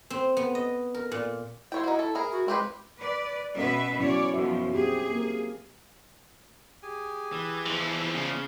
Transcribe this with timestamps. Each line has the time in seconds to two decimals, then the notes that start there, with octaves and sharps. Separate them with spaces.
0.10 C4
0.37 B3
0.55 D#5
0.94 A#4
1.12 A#2
1.72 E4 C5 C#5 G5
1.84 D#4 F#4
1.99 A4
2.15 E4 G#4 A#4
2.32 F#4
2.48 G#3 C4 G4 B4
2.99 B4 D5
3.56 B2 C#4 B4 E5
4.00 F#3 C#4 E4 C#5 D5
4.34 F#2 B2 F3 F#4 C#5 E5
4.73 C4 G4 G#4
5.10 A#3 A#4
6.83 G4 G#4 G#5
7.32 E3
7.66 E2 F3
8.15 C#3 D5 F5